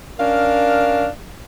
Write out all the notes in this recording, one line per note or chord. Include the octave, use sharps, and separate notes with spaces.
C#4 D4 A#4 F5